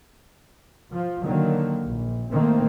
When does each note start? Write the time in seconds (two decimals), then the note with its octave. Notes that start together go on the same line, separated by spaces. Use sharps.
0.93 F3
1.24 D3 D#3 F#3 A#3
1.84 A#1
2.32 D#3 A3 A#3 C4